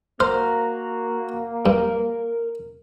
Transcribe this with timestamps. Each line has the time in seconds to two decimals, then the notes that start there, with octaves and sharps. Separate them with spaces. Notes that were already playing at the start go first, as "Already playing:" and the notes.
0.20 A#3 F#4 C5 A#5 F6
1.66 G2 A#4